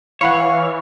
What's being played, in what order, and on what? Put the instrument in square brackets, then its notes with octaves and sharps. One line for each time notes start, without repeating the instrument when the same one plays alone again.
[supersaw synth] E3 [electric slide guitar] C#5 [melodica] F5 [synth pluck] F#5 B5 C#7